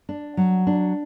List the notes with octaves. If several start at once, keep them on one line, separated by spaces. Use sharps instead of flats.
D4
F#3
D4